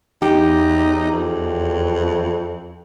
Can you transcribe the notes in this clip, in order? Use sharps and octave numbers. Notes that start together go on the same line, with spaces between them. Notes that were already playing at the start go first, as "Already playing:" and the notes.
E2 D#4 G4
F2